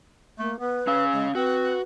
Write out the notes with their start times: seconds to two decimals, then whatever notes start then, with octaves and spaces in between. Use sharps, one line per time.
0.39 A3 A#3
0.60 B3 B4
0.87 C#4 F5 E6
1.13 G#3
1.35 C4 F#4 B4